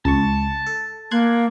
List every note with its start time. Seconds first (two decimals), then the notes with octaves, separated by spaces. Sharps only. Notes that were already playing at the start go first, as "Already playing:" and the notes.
0.05 C#2 A5 C#6
0.66 A4
1.11 A#3 C6 F#6 G#6